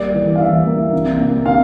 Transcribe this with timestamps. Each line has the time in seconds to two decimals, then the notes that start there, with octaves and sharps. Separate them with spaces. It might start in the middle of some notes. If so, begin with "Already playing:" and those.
Already playing: G3 A#3 D5
0.14 E3
0.36 F5
0.40 E3 E5
0.67 A#3
0.93 C3
1.19 A#3
1.46 C3 F5